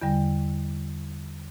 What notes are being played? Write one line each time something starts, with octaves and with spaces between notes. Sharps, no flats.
E2 D3 G3